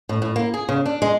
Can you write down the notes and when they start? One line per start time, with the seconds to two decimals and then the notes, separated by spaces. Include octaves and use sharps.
0.09 A2
0.22 A2
0.36 A#3
0.54 G#4
0.69 C#3
0.86 D4
1.02 G#3